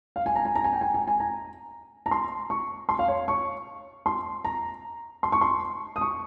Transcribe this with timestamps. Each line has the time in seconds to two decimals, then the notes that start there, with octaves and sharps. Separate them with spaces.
0.16 F5
0.26 G#5
0.36 A#5
0.45 G#5
0.56 A#5
0.64 G#5
0.73 G5
0.81 G#5
0.94 G#5
1.07 G#5
1.20 A#5
2.06 A#5
2.11 C6
2.50 C#6
2.89 C6
2.99 F5
3.08 C#5
3.28 C#6
4.06 C6
4.45 A#5
5.23 C6
5.32 C#6
5.41 C6
5.96 D#6
6.01 C#6